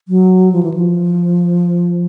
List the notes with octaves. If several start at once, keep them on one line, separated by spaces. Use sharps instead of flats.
F#3
F3
E3
F3